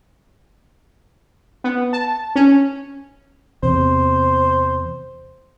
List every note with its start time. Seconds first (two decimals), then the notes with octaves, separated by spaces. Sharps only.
1.64 B3
1.93 A5
2.36 C#4
3.63 E2 C3 C5